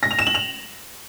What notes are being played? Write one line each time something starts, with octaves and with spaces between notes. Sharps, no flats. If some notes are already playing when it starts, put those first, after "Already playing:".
A#6
F7
E7
F#7
F7